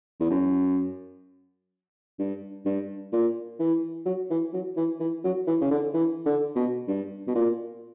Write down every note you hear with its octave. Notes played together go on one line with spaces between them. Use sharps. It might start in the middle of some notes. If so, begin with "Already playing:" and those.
E2
F#2
G2
G2
A#2
E3
F#3
E3
F#3
E3
E3
F#3
E3
C#3
D3
E3
D3
B2
G2
B2
A#2